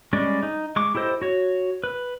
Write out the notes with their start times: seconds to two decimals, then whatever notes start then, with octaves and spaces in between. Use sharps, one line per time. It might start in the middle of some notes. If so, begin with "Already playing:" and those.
0.13 G3 G#3 C#4 D5 C#6
0.43 D#4
0.76 G#3 C#6 D6
0.95 E4 G4 A4 C5 D#5
1.22 F#4 C#5
1.84 B4